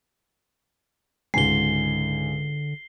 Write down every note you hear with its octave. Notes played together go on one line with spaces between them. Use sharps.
C#2 G#2 D3 G#5 C7 G7